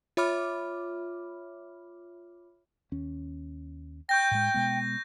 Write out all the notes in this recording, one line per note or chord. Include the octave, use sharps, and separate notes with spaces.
F4 C#5 E5 B5 D6 F6
D#2 C#4
G5 C#6 G6 A#6
A2 G#3
B2 G#3 B3